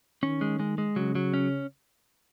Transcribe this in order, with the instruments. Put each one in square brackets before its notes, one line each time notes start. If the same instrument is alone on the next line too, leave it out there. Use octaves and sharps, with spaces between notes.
[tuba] D#3 [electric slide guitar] C#4
[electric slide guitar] G#3
G#3
G#3
[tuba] C#3 [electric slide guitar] F#3
[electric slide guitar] F#3
C#4